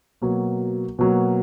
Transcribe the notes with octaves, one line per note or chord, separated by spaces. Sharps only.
B2 F#3 A#3
B2 F#3 A#3